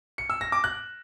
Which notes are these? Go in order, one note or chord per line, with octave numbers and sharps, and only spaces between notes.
C#7
E6
A#6
D6
F#6